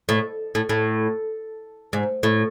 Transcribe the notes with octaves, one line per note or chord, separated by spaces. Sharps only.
A2
A2
A2
G#2
A2